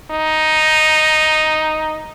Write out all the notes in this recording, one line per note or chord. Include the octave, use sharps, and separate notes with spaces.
D#4